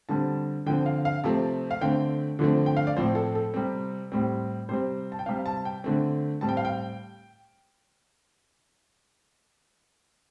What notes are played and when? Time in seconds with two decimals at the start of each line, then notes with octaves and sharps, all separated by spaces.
0.09 D3 G3 C4 A5
0.66 D3 F3 C4 G5
0.86 F5
1.05 F5
1.24 C3 F3 A3 C4 A5
1.71 F5
1.81 D3 A3 C4 G5
2.39 D3 F3 A3 C4
2.66 G5
2.77 F5
2.87 D5
2.97 A2 F3 C4 C5
3.15 A4
3.35 A4
3.54 C3 G3 C4
4.12 A2 G3 C4
4.69 C3 G3 C4 C5
5.12 A5
5.19 G5
5.26 C3 G3 C4 F5
5.46 A5
5.65 G5
5.84 D3 A3 C4
6.41 A2 G3 C4 A5
6.49 G5
6.57 F5
6.65 G5